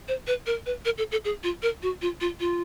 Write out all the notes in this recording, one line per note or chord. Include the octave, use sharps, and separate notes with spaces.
C5
B4
A#4
B4
A#4
A4
A4
G#4
F4
A#4
F#4
F4
F4
F4